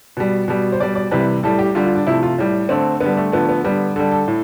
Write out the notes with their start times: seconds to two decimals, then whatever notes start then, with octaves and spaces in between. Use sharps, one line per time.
0.17 B2 G3
0.48 B2 G3
0.72 C5
0.80 B2 G3 D5
0.95 D5
1.11 C3 E3 G3 B4
1.43 A2 G3 A4
1.59 G4
1.75 D3 G3 F4
1.86 F4
1.95 D4
2.07 C3 F3 A3 E4
2.23 F4
2.38 A2 G3
2.69 D3 A3 C4
3.01 D3 G3 B3
3.17 A3
3.32 D3 F3 A3 B3
3.49 B3
3.64 D3 G3 B3
3.96 D3 G3 A4
4.12 A4
4.28 A2